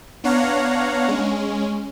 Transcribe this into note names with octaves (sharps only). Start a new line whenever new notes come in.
B3 D4 C#5 F5 F#5 A#5
G#3 C#4